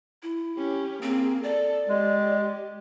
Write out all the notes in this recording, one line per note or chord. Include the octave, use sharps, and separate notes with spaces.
E4
C#4 G4
A#3 C4 G#4
A4 D5
G#3 G4